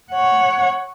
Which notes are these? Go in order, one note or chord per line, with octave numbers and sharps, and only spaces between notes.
C#5 F#5